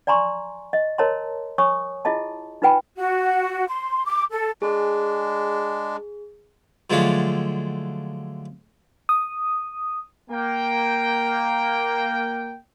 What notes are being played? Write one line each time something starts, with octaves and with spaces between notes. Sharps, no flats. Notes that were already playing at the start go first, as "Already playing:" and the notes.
D5 G#5 A#5 C6 C#6
D#5
A#4 C#5 D#5 A5 A#5 C6
C#5 G#5 C#6 D#6
E4 F4 G#4 D#5 A5
D#4 F4 B4 G5 G#5 B5
F#4
C6
D6
A4
G#3 D4 G#4
D3 F3 F#3 G#3 A3 D4
D#6
A#3 G5